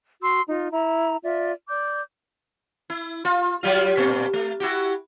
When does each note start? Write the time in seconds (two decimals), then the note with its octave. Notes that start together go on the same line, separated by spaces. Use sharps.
0.21 F#4 C6 E6
0.48 D#4 F4
0.71 E4 A#5
1.24 F4 D5 E5
1.68 D5 D6 G6
2.90 E4
3.25 F4
3.63 F#3 G3 F4
3.97 G2 A#2 C4
4.33 A3
4.60 E4 F#4 G4